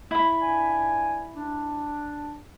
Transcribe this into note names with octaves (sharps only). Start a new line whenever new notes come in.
E4 B5
G2 D5 G#5
D4